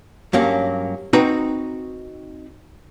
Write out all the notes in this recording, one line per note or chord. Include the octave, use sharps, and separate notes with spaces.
G2 F#3 A#3 C#4
C4 D#4 F#4 B4 G5 A#5